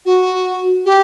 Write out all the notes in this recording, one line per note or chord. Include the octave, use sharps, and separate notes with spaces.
F#4
G4